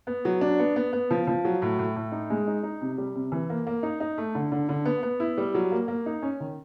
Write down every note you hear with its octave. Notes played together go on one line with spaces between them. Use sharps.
B3
F#3
D4
B3
B3
B3
F3
F3
F#3
A2
A2
A2
D#4
G#3
D#4
D#4
C3
G3
C3
E3
A#3
A#3
D#4
D#4
A3
D3
D3
D3
B3
B3
E4
G3
F#3
A#3
A#3
D#4
C#4
D#3